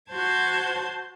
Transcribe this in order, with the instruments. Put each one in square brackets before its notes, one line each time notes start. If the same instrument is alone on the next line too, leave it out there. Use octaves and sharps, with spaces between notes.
[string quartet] F#4 C5 A5 C6 G#6